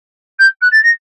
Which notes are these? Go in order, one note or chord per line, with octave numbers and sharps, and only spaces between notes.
G6
F#6
A6
A#6